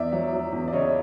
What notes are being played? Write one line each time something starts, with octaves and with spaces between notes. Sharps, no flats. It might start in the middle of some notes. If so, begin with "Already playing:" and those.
Already playing: E2 D5 E5
F#3
F#3
E2
D5
C#3 C#5 D#5